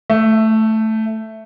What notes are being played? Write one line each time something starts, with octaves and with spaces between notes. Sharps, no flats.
A3